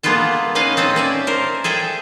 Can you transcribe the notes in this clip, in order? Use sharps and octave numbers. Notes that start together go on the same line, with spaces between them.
G#3 A#3 B3 F4 A4
C#4 D#4 B4 D#5 F5
C4 A4 C5 C#5
C#4 D5 E5
A#4 C5
G#4 A4 E5 G5